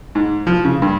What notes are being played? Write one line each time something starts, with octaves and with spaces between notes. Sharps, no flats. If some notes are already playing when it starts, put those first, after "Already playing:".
G#2
F3
C#3
G2